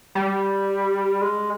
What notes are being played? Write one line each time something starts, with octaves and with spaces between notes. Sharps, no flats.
G3
G#3